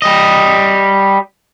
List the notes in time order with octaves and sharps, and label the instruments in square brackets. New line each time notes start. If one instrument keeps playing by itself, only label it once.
[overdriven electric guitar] G3 D#5